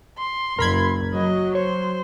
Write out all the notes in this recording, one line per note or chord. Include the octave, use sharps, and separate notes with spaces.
C6
F#1 A#4 B5 G#6
F#3 D#5
C5 C#5